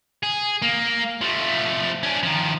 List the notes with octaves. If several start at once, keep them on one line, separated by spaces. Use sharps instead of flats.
G#4
A#3
F3 A3
C#4 D4
D#3 F3